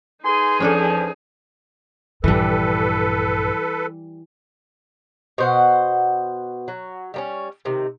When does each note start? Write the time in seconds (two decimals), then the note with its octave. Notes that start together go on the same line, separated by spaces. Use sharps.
0.24 D#4 G#4 B4 G#5 C6
0.60 E2 F3 C#4 D4 A4
2.24 A#1 G2 E3 G3 A4 B4
5.38 B2 C5 F#5
6.68 F#3
7.14 G3 A#3 C#4
7.65 C3 D#3